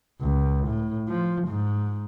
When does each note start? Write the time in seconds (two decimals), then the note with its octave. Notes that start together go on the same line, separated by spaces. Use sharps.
0.21 C#2
0.67 A2
1.08 F3
1.47 G#2